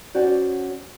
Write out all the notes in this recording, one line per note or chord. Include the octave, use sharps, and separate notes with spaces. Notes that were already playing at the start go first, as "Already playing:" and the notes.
C#4 F#4 C5 D5